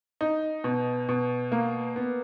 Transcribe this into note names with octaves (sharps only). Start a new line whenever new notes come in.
D#4
B2
B2
A#3
B3